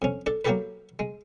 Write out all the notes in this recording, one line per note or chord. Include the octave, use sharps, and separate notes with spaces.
F2 C#4
D4 A4
F#3 A#3 F#4 G4 A4 B4
G#3